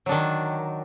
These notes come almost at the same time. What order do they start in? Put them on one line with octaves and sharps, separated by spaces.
F#3 D4 D#3